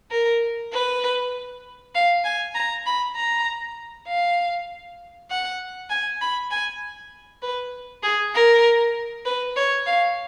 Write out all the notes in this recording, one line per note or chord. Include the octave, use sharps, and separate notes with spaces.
A#4
B4
F5
G#5
A#5
B5
A#5
F5
F#5
G#5
B5
G#5
B4
G#4
A#4
B4
C#5
F5